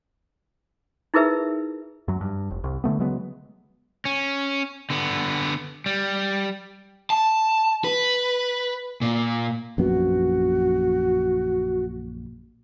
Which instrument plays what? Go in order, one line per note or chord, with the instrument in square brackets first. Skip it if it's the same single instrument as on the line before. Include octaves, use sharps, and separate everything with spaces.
[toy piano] D#4 E4 G#4 A#4 B4 E5
[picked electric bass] F#2 F#3
G2
F1
C2
D3 D#3 A3 B3
C#3 F#3 G#3 B3
[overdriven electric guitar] C#4
D3 B3
G3
A5
B4
A#2
[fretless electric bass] A#1 F#2 B3 [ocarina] F#4